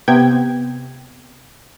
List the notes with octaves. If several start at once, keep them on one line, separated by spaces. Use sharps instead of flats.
C3 B3 G5 G#6